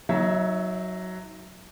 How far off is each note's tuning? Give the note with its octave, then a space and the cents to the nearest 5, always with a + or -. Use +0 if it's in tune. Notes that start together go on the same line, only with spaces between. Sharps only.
F#3 +0 D#4 +35 E5 +0